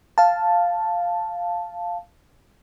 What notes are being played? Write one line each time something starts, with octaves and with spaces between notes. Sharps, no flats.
F5 A5